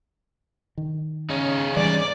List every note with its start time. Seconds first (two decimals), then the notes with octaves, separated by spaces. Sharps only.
0.77 D#3
1.30 C#3 C#4 D#4
1.76 E3 G3 D5